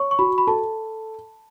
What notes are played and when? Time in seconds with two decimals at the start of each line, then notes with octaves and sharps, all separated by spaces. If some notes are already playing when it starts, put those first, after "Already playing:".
Already playing: C#5 C#6
0.11 C#6
0.19 F#4 B5
0.38 B5
0.47 A4 A5